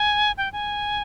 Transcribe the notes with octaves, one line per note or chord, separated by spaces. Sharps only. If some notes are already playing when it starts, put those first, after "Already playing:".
Already playing: G#5
G5
G#5